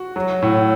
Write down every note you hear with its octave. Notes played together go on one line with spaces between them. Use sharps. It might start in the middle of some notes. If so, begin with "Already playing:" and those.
Already playing: F#4
F#3
A2